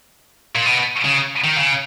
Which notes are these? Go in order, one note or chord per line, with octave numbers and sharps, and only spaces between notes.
A#2
B2
C#3
D#3
C#3